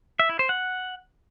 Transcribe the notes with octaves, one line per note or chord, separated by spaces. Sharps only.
E5
E4
C5
F#5